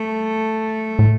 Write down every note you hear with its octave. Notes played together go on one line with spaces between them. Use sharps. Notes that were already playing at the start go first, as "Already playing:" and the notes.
Already playing: A3
A2